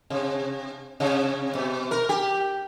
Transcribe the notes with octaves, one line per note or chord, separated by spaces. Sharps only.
C3
C3
B2
A#4
G4